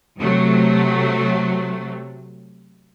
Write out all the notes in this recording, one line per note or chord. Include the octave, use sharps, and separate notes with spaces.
C3 F#3 A3